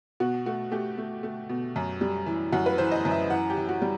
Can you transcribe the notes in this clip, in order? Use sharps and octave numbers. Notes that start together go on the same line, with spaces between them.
B2 F#4
A3 F#4
A3 G4
A3
A3
B2
F#2
G3
E3
F#2 F#4
B4
E3 C5
D#5
F#2
E5
E3 F#5
G4
E3
F#4
G3